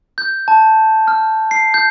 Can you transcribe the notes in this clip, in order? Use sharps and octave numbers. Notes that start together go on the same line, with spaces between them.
G6
A5
F6
C7
G6